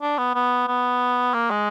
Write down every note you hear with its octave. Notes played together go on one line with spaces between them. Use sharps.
D4
B3
B3
B3
A#3
G#3